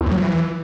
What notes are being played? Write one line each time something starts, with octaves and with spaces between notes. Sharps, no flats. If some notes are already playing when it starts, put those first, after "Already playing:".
E2
A2
F#3
F3
E3